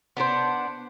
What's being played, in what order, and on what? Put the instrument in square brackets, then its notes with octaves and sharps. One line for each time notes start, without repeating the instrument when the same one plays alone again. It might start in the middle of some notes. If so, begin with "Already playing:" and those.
[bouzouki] B3 D4 A4 C5